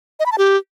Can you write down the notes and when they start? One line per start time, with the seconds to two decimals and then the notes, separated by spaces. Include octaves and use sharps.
0.20 D#5
0.26 B5
0.32 A5
0.38 G4